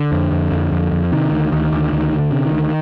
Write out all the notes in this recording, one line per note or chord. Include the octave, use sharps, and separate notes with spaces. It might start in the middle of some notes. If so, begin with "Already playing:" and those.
Already playing: D3
F2
F2
F2
F2
F2
C3 D#3
D2
D2 D#3
D2
D2 D#3
D2
D3
C3
D#3
D2